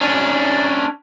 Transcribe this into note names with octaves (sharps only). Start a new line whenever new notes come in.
C#4 D4